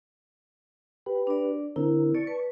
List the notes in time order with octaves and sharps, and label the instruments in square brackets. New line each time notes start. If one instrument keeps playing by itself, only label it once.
[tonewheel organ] G4 B4
[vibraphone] D4 D5
[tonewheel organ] D3 C4 A#4 [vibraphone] E4
[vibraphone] D5 [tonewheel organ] A5 C#6
[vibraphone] B4